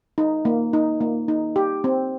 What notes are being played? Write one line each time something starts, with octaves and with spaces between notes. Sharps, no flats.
D#4
A#3
D#4
A#3
D#4
G4
C4